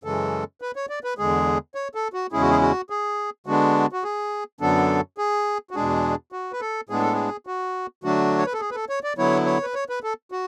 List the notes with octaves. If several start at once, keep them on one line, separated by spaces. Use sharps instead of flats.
F#2 C#3 E3 G#3 A4
B4
C#5
D5
B4
E2 D3 G#3 G#4
C#5
A4
F#4
E2 C#3 G#3 C#4 E4 G#4
F#4
G#4
F#4
G#4
D3 G#3 B3 D4 F#4
F#4
G#4
F#2 D3 F#3 B3 D4 A4
G#4
F#4
E2 B2 G#3 D4 G#4
F#4
B4
A4
A2 G#3 B3 D4 G#4
A4
G#4
F#4
D3 F#3 A3 D4 F#4
C#5
B4
A4
G#4
B4
A4
C#5
D5
D3 F#3 B3 E4 C#5
C#5
B4
C#5
B4
A4
F#4